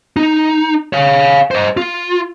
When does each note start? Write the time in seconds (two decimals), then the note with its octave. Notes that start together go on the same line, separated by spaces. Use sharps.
0.17 D#4
0.93 C#5 F5
1.51 C5 D#5
1.77 F4